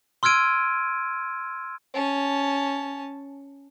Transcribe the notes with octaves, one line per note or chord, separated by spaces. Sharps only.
C6 E6 F6 G#6 D7 D#7
C#4 A5